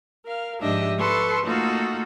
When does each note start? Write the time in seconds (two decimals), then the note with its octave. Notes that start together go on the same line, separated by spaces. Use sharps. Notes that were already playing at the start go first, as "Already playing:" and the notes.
0.25 A#4 F5
0.61 G#2 F3 D4 G4 D#5 E5
0.99 A4 B4 C6 C#6
1.46 A3 A#3 D#4 F4 F#4 A4